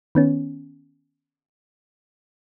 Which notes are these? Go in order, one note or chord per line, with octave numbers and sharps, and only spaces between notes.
D#3 B3 C#4